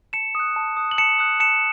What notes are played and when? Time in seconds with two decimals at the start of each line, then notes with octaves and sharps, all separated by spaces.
0.13 A5 C#7 E7
0.35 D#6 F#6
0.56 A5
0.77 D#6 F#6
0.91 F#7
0.98 A5 C#7 E7
1.19 D#6 F#6
1.40 A5 C#7 E7